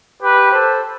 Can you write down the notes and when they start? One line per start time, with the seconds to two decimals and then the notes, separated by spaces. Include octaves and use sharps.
0.20 G4 B4
0.52 A4 C5